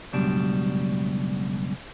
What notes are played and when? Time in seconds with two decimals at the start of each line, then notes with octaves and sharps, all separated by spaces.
0.13 C#2 F#2 B2 G3 D4